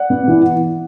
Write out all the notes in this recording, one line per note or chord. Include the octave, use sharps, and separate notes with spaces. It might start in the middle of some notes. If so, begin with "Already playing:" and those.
Already playing: D5 F#5
B3
E3